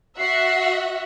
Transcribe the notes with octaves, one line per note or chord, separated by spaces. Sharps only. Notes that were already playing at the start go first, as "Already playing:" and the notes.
F#4 E5 F#5 C7